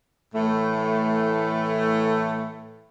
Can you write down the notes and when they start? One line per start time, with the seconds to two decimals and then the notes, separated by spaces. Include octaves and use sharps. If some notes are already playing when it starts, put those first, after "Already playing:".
0.34 A2 E3 A3